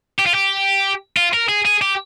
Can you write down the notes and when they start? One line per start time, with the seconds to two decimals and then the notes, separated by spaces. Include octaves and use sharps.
0.19 G4
0.27 F4
0.35 G4
1.17 F4
1.34 A#4
1.49 G#4
1.65 G#4
1.81 G4